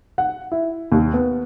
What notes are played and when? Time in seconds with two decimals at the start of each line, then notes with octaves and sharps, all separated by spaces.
0.18 F#5
0.52 E4
0.92 D#2
1.14 B3